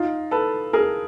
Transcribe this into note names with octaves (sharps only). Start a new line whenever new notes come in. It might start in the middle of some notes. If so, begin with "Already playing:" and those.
Already playing: D#4 F4
A4 B4
G#4 A#4